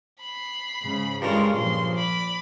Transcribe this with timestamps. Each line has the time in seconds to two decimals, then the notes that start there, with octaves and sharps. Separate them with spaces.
0.21 B5 C7
0.83 G#2 C#3
1.22 G2 C#3 G#3 F4 A#4
1.55 A#2 F3 C6
1.97 D5 B5